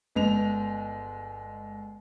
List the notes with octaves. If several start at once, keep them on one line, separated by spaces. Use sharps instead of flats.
G1 G#3 F7